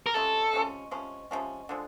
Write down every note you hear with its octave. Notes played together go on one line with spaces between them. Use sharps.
A#4
C3 F3 G#3 C#4 A4
C3 F3 G#3 C#4
C3 F3 G#3 C#4
C3 F3 G#3 C#4
D3 F3 G#3